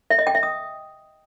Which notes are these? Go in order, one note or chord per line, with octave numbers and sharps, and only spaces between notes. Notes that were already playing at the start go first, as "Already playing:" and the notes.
E5
D#5
G5
E5
D#6